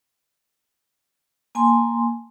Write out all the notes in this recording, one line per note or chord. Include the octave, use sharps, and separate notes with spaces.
A#3 G#5 A5 C6